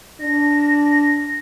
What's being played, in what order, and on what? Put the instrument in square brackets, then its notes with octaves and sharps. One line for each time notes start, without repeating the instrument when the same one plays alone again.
[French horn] D4 [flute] A#6